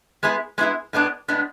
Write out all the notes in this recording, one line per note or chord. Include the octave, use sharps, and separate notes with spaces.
G#3 B3 E4 G#4
G#3 B3 E4 G#4
A2 G#3 B3 D4
A2 G#3 B3 D4